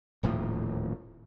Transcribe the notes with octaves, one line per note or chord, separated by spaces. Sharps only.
D#1 D2 A2 F3